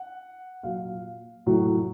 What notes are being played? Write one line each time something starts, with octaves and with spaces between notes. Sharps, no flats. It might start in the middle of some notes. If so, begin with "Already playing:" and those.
Already playing: F#5
A#2 F#3 F5
A2 F#3